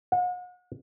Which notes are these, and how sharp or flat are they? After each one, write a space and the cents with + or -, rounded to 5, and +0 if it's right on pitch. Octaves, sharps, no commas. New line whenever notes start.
F#5 -40